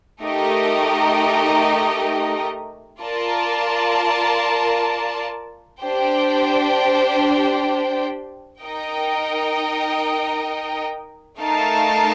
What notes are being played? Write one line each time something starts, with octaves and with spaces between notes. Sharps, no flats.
A3 D#4 G4 A#4 D#5
F4 A#4 D5 A5
D4 G4 C5 G5
D#4 A#4 D#5 G5
A3 D#4 A#4 F5 A5